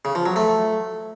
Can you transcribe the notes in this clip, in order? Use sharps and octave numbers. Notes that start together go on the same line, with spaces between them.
C#3
F3
F#3
A3